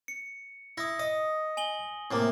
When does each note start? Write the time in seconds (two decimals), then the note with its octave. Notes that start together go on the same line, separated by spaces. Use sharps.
0.08 C#7
0.78 E4 D#6 A#6
0.99 D#5 D#6
1.57 G#5 F#7 G7
2.11 A2 C3 A#3